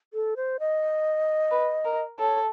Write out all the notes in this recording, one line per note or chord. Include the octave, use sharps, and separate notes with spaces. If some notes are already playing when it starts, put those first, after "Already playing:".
A4
C5
D#5
B4
A#4
A4 C#5